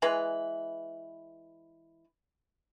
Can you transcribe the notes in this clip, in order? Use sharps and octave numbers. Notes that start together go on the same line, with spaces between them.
E3 G#3 B4